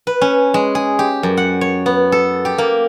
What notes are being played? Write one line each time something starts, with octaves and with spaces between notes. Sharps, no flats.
B4
C#4
G#3
G#4
G4
F#2
F#5
C#5
B3
A4
G4
A#3